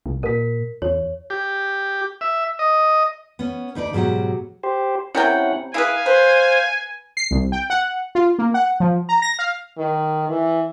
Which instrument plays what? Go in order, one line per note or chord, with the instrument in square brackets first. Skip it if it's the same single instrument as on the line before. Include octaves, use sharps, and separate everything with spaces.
[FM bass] C2
[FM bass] A#2 [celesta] A#4 B6
[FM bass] E2 [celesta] C#5
[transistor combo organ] G4
E5
D#5
[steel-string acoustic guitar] B3 C#4
D2 D#4 B4 D5
G#2 B2 F#3 G4 F#5
[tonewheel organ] G4 C5
[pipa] C3 A#4 G5 [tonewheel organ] C#4 E4 F#5
[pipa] E4 G#4 B4 [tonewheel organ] F5 [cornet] G#5
[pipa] B4 [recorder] C5
[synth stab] C7
C2
G5
F#5
F4
A#3
F#5
F3
A#5
A#6
F5
[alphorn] D#3
E3